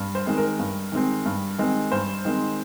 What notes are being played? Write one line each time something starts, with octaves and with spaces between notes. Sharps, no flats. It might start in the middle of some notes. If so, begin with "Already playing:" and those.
Already playing: G2
C5
D#3 G#3 C4
A#4
G2
D#3 G#3 C4
G2
D#3 G#3 C4
G2 C5
D#3 G#3 C4